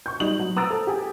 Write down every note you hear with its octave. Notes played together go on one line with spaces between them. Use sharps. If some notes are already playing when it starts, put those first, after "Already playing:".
C#6 G6
G3 D#4 F#7
F#3
A#5 D#6 E6 A6 D7
A4 C5
G4 G#4